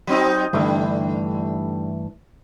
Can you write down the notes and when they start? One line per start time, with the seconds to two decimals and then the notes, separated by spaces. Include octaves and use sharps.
0.07 F#3 C4 D#4
0.53 G2 D3 E3 G3 A3